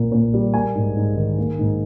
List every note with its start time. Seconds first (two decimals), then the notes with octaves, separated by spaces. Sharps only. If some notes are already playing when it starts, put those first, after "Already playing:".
Already playing: A#2 A#3
0.12 A#2
0.34 G3
0.54 A#3 G#5
0.75 G#2
0.96 G#2
1.16 D#3
1.38 A#3
1.59 G#2